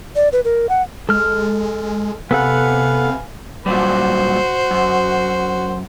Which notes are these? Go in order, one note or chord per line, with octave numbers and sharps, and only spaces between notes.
D5
B4
A#4
F#5
G#3 A4 F6
C3 B3 A4 B4 F5 F#5 G#5
A#2 F#3 G3 F#4 C5
F#2